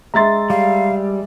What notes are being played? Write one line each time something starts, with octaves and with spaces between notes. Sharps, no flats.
G#3 E5 A#5 C6 A6
G3 F5